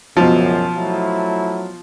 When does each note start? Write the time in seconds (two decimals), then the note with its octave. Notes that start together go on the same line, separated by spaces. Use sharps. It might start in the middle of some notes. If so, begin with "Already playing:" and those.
0.17 C#2 F#2 B2 F3
0.78 F#3 A3 E4